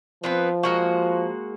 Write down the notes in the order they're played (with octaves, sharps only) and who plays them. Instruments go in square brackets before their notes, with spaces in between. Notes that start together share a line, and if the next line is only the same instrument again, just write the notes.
[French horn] F3 [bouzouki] B3 C4 B4
[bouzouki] G#3 A#3 F#4